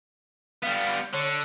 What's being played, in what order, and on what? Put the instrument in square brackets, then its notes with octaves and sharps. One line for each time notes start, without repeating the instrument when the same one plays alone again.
[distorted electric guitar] G3 B3 [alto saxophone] F5
[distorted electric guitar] D3 [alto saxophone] C#5